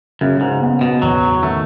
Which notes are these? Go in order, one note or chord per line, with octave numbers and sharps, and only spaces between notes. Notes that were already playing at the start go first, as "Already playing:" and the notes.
F#2 C#3
G#2
B3
B2
E2 F#3
D#3 A3